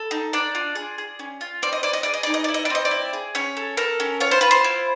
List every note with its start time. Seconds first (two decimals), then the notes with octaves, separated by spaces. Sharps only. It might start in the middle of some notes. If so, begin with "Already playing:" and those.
Already playing: A4
0.11 D#4
0.33 D4 D5
0.55 F4
0.75 G#4
0.98 G#4
1.19 C#4
1.41 F4
1.62 C4 D5
1.73 D#5
1.83 E4 D5
1.93 D#5
2.03 G#4 D5
2.14 D#5
2.23 D#4 D5
2.34 D#5
2.44 E4 D5
2.54 D#5
2.65 D5
2.70 C4 D#5
2.85 D5
2.91 E4
3.13 G#4
3.35 C#4 C#5
3.57 A4
3.77 A4 A#4
4.00 C#4
4.20 F4 C#5
4.31 C5
4.41 F4 B4
4.51 C5
4.64 E4